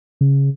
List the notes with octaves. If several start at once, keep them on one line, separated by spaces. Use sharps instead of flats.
C#3